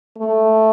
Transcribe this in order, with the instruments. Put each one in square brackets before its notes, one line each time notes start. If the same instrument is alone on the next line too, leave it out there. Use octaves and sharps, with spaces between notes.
[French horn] A3